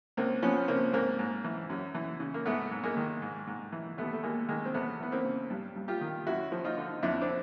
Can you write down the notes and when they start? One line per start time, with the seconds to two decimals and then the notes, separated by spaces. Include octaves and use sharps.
0.17 C#2 A#3 C4
0.43 F3 B3 C#4
0.68 C#3 A#3 C4
0.93 G#2 A#3 C4
1.19 G#2
1.44 E3
1.70 F#2
1.95 E3
2.20 C#3
2.34 A#3
2.46 G#2 A3 B3
2.71 G#2
2.84 G#3 A#3
2.97 D#3
3.22 G#2
3.47 G#2
3.72 E3
3.98 D#2 A3 B3
4.13 A3
4.23 D#2 G#3 A#3
4.49 D#3 G#3 A#3
4.65 C4
4.74 E2 A3 B3
5.00 E3 B3
5.12 A#3 C4
5.25 C#3
5.50 G2
5.76 G2
5.88 F4 G4
6.01 D#3
6.27 F#2 E4 F#4
6.52 F3
6.64 D#4 F4
6.77 D3
7.03 F2 D4 E4
7.21 C4 D4